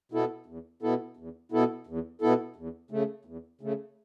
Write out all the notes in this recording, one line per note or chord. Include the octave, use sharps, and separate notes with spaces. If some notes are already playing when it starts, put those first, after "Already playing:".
B2 B3 E4 A4
E2
B2 B3 E4 A4
E2
B2 B3 E4 A4
E2
B2 B3 E4 A4
E2
C#3 A3
E2
C#3 A3